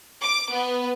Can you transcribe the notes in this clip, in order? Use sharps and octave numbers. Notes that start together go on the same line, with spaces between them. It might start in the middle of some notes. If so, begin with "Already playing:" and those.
D6
B3